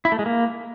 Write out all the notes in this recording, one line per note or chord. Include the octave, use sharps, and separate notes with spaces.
E4
A3
G#3
A#3